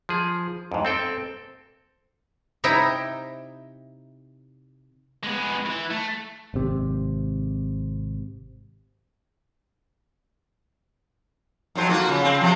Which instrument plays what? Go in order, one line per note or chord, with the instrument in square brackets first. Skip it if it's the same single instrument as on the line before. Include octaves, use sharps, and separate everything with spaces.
[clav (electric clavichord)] F3 G#4
F2 G#2
C4 A4 G5
[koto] C3 D#4 E4 G5 A#5
[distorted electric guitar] G#3 B3
E3
A3
[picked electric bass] G#1 C3
[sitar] F2 F#3 C5
A#3 F4 F#4
C#3
C#3 C4
C3 F3